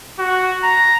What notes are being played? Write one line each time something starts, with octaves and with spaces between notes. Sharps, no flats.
F#4
A#5